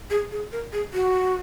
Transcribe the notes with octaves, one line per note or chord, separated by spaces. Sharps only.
G#4
G#4
A#4
G#4
F#4